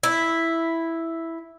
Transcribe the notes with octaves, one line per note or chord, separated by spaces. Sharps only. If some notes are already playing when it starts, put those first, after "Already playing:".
E4